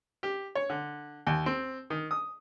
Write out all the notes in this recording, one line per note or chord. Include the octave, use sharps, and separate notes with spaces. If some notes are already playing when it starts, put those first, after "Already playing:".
G4
C#5
D3
D#2
C4
D#3
D#6